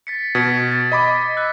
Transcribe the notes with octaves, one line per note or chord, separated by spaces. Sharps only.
A6 B6 C#7
B2 G#6 B6 C#7
A6
D#5 B5 D6
E6 F#6 B6